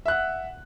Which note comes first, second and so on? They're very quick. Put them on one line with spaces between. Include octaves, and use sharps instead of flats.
E5 F#6 F#5